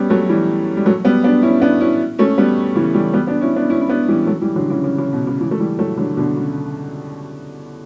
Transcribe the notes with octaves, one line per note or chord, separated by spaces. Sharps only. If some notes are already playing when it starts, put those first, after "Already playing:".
Already playing: G3 B3 C#4
F#3 A3
E3 G3
G3
F#3 A3
G3 B3
B3 D4
C#4 E4
B3 D4
C#4 E4
A3 C#4
G3 B3
C#3 E3
E3 G3
G3 B3
B3 D4
C#4 E4
B3 D4
C#4 E4
E4
B3 D4
E3 G3
F#3 A3
E3 G3
D3 F#3
C#3 E3
C#3
C#3
B2
C#3
C#3 E3
A3
E3 G3
F#3 A3
D3 F#3
B2 D3
C#3